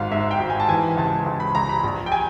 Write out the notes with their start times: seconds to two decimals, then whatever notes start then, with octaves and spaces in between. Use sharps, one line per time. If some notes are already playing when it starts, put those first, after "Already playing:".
Already playing: G#1 G#2 F5
0.12 G#2 E5
0.31 G5
0.40 G#1
0.50 G#5
0.60 A5
0.69 E3 G#5
0.97 C#2 A5
1.26 C#2
1.40 B5
1.55 C#2 A#5
1.69 B5
1.84 A#1
2.06 G5
2.12 G#5